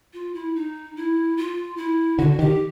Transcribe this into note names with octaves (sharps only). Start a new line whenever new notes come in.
F4
E4
D#4
E4
F4
E4
D3 F#4
D#3 G4